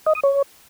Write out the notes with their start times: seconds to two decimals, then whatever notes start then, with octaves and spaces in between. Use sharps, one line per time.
0.06 D#5
0.15 D#6
0.23 C#5